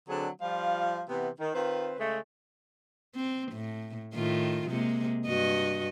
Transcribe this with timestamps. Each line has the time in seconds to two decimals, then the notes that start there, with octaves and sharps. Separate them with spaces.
0.09 D3 F#3 C4 D4 G#4
0.42 F3 G3 F4 F5
1.09 C3 E3 B3
1.40 D#3
1.55 D#3 C4 F4 B4
2.00 C#3 G#3 A3
3.16 C4
3.52 A2
4.14 A2 D#3 F4
4.69 C3 G#3 A#3
5.27 G2 F#4 D#5